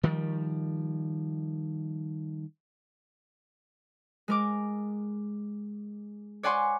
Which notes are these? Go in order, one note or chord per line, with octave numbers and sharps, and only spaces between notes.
D#3 F3 G3
G#3 A#4 D6
C#5 D5 F#5 G#5 C6 C#6